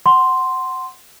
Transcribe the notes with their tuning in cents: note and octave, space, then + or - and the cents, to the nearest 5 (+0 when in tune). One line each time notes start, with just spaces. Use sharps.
F#5 +10 C6 +0